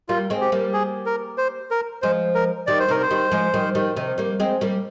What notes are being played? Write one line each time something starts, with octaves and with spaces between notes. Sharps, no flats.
G3 A#3 F4
G#3 C4
G4
G3 A#3
G#4
A#4
C5
A#4
F3 G#3 C5
A#4
D#3 G3 D5
C5
C3 D#3 A#4
C5
D#3 G3
F3 G#3
D#3 G3
D#3 G3
C3 D#3
G3 A#3
G#3 C4
G3 A#3